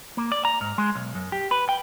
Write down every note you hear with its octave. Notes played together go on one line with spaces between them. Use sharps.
A#3
D5
A#5
G#2
G#3
B1
F#2
G4
B4
G5